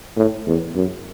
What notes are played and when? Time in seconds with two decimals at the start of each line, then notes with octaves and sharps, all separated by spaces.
0.16 A2
0.46 E2
0.75 F#2